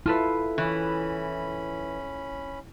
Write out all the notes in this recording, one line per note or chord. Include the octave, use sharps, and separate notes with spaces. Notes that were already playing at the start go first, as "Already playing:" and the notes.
E4 F4 A4 B4
E3 C#4 B5